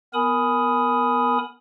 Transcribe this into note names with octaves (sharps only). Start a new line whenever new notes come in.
B3 A#4 G#5 B5 D#6